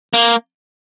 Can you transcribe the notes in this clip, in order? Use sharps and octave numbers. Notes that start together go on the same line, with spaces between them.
A#3